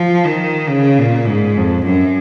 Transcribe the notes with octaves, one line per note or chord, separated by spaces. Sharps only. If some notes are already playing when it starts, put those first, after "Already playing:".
Already playing: F3
D#3
C#3
A#2
G#2
F2
F#2